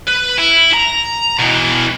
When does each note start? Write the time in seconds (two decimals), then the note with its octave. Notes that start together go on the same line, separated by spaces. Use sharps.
0.08 B4
0.38 E4
0.74 A#5
1.39 B2 E3